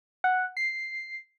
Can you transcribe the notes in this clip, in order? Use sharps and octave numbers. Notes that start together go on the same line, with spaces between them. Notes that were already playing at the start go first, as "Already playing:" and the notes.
F#5
C7